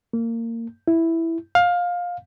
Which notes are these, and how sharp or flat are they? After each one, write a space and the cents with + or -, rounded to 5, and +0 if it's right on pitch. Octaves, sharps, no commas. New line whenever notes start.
A#3 -25
E4 +0
F5 +20